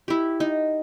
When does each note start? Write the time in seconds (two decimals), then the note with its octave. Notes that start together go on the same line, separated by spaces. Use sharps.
0.08 E4 G4
0.40 D#4